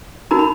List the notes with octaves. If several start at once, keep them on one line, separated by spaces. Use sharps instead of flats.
D#4 F#4 A#4 A#5
B5